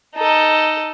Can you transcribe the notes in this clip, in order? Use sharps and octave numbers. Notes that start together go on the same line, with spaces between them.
D#4 A4